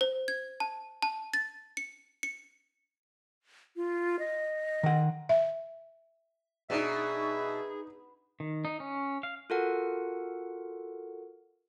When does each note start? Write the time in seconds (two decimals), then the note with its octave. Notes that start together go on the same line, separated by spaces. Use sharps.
0.01 C5
0.28 G#6
0.60 A5
1.02 A5
1.33 A6
1.77 C#7
2.23 C#7
3.76 F4
4.19 D#5
4.83 D#3 F#5
5.29 E5
6.70 B2 D4 D#4 G#4 E5
8.40 D#3
8.65 D#4
8.80 C#4
9.23 F5
9.50 F4 F#4 A4 A#4 F#5